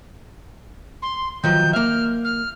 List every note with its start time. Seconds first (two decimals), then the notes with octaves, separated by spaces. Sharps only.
1.02 C6
1.44 D#3 F3 F#3 G6
1.73 A#3 E5 F6
2.24 F6